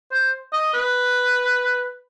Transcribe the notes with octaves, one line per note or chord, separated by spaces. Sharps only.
C5
D#5
B4